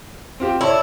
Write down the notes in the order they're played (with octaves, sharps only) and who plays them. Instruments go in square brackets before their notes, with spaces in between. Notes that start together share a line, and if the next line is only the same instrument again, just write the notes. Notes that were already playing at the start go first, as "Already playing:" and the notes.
[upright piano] C4 F4 G4
[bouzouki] E4 [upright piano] A4 C#5 D5